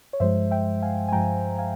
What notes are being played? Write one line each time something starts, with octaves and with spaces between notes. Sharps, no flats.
C#5
G2 F3 G#3 C5 E5
E5 G5
F5 G#5
G#5
G2 F3 G#3 G5 A#5
F5 G#5